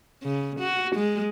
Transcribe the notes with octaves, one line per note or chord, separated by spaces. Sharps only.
C#3
F#4
G#3